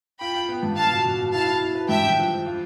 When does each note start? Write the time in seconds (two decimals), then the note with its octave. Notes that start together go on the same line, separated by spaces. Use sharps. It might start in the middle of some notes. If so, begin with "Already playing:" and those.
0.20 F4 G5 B5
0.34 F4
0.49 B3
0.63 G2
0.76 B3 F5 A5
0.91 B2
1.05 B2
1.19 B2
1.33 E4 F5 A5
1.47 E4
1.62 E4
1.75 B4
1.89 G2 E5 G5
2.04 G2
2.18 F3
2.31 F3
2.46 F4